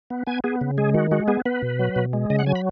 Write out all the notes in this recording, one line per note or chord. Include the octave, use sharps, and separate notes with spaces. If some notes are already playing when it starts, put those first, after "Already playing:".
B3
B3 G#5
B3 G#4
C#3
G#3 G#4
D#3 F#4
G#3 F#4
B3 G#4
B3 B4
B2
F#3
B2
G#3
C#3 D#5
F#5
F#3 G#5
B5